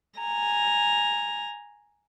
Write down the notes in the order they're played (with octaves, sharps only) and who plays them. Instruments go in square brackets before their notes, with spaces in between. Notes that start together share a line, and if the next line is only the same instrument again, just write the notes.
[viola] G#5 A#5